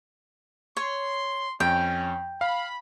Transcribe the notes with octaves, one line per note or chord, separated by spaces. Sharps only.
C#5 C6
F2 C#4 G5
F5 B5